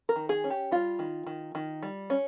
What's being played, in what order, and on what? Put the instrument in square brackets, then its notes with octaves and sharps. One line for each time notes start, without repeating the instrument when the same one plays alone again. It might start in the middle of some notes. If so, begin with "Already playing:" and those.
[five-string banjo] A#4
D#3
G#4
C#4
G4
G3 F4
D#3
D#3
D#3
G3
C#4